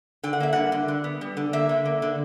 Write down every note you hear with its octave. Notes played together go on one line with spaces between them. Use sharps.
D3 G5
F#5
A#3 E5
G3 F#5
D3
D3
B3
G3
D3
A#3 E5
D3
A#3
D3